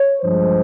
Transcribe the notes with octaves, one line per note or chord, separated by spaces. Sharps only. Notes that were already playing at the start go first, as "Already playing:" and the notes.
Already playing: C#5
G2 F3 G#3 C5